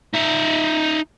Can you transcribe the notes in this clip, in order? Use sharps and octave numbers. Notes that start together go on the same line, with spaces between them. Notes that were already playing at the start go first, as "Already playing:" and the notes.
D#4 E5